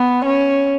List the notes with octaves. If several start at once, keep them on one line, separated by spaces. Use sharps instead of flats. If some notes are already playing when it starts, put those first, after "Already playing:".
Already playing: B3
C#4